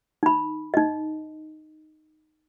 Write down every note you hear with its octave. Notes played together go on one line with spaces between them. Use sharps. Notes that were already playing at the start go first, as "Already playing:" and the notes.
D#4 B5
D#4 D#5